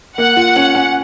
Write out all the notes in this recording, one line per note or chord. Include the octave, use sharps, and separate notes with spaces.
A#3 F#5
F4
C#4
C#4